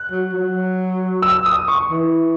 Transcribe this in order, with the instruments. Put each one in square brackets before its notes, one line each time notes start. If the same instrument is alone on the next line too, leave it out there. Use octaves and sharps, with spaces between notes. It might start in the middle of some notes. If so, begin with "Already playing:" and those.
Already playing: [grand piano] F#6
[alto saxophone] F#3
F#3
[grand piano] E6
D#6
C#6
[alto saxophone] E3